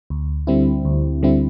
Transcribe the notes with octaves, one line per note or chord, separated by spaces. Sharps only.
D2
D3 G3 C4 E4
D2
D3 G3 C4 E4